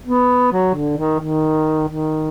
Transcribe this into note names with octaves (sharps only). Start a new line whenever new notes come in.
B3
F#3
D3
D#3
D#3
D#3